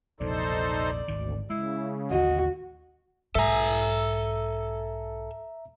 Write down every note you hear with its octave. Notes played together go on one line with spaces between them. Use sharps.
A#1 E2 C3 D#4 A4 C5 D5
G#1 D2 D#3
C#3 G#3 E4
A1 D#2 D3 F#4 D#5
B1 G#2 A4 E5 G#5 A#5